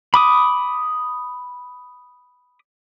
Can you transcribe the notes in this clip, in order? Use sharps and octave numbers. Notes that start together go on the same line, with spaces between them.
B5 D6 D#6